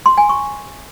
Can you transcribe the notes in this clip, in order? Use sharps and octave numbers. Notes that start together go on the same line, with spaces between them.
C6
G#5
C#6